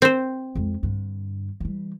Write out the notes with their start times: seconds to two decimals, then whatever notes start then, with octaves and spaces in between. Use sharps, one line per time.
0.02 C4 C5
0.55 F2 G#3
0.83 G2 D3
1.60 E3 G3